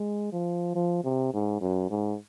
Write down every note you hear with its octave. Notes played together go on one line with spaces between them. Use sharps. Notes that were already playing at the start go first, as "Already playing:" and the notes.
Already playing: G#3
F3
F3
C3
G#2
F#2
G#2